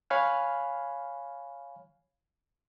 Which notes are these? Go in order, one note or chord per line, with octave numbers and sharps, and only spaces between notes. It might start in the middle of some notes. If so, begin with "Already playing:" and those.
C#5 F5 G#5 B5 F6 F#6